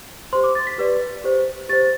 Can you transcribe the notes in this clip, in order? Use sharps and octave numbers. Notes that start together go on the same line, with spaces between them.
G4 C5 C6
D6
A6
B6
G4 B4 D5
G4 C5
G4 C5 A6